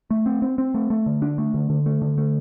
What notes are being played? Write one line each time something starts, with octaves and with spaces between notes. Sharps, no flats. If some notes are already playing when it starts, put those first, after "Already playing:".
A3
C4
C4
C4
A3
A3
D3
D4
A3
D3
D3
A3
D3
A3